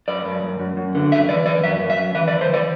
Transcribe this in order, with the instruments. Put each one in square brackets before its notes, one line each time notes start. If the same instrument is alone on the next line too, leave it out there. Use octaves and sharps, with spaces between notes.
[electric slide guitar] F#2 D5
F#2
F#2
F#2
F#2
D3
F#2 E5
E3 D5
E3 D5
F#2 E5
F#2
E5
F#2
E3 E5
D5
E3
C5
E3 D5